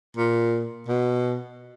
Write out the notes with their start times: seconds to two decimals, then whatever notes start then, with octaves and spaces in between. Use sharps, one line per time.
0.17 A#2
0.89 B2